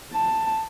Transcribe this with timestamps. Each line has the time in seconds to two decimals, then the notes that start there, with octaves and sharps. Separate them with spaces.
0.12 A5